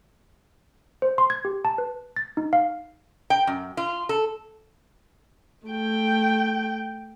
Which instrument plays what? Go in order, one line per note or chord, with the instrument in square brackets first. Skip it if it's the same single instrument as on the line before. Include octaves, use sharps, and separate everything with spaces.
[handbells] C5
C6
G#6
G4
A5
B4
A6
D#4
F5
[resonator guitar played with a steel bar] G5
F#2
F4
A4
[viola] A3 G5